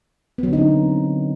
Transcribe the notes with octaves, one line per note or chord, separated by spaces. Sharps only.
D3 F#3 B3 C4 D#4